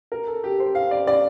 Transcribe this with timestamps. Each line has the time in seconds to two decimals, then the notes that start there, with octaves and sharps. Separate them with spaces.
0.12 A#4
0.27 A4
0.44 G4
0.60 C5
0.75 F5
0.91 D5
1.07 D5